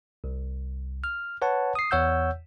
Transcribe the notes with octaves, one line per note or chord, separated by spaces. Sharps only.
C2
F6
B4 C#5 F#5 A5
D#6 C7
E2 C#5 F#5 E6 G6